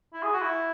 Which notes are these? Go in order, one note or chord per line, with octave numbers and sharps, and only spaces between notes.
E4
G#4
F#4
E4